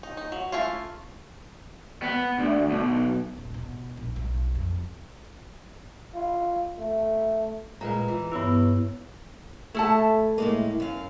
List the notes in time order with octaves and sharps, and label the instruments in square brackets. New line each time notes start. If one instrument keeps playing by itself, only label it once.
[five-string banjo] D#4
D#4
F#3
A3 C#4 E4 F4
[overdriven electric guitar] B3
D2
B1
[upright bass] D#1
B2
A#1
B1
F2
[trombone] F4
A3
[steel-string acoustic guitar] A#2 G#3 [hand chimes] B4 A#5
[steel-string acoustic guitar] E3
[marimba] G2 B3 E6 [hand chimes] E4 B4 C#5
[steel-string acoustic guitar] A3 [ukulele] E4 A4 A5
[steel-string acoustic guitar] A2 G#3 A#3
F#2 F5